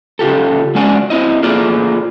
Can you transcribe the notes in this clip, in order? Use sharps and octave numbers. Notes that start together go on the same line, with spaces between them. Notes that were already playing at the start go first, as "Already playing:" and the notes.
C#3 F4 G4 A4
G#3 C#4 D4 F#4 D5 G#5
C4 E4 D#5
A3 A#3 F4 G#4 D5